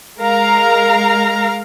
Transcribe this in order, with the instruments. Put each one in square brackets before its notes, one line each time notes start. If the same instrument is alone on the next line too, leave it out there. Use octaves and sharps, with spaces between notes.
[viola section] G#3 A#4 F5 A#5